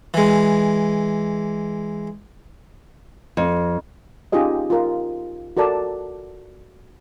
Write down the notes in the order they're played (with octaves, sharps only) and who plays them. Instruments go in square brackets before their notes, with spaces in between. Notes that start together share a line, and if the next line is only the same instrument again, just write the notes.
[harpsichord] E3 G#3
[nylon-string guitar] F2
[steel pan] C#4 D#4 F4 G4 G#4 D#5
F4 A#4
F#4 A4 A#4 D5 A5